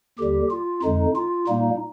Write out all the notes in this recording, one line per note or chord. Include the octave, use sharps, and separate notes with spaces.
D#2 D3 G3 G4
F4
F2 D3 G#3 D#4
F4
A#2 G3 A#3 D#4